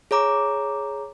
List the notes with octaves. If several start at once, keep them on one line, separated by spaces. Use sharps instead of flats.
G#4 C#5 A#5 D6